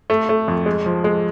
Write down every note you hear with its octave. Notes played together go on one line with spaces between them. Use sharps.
A3
A3
F2
G#3
F3
G#3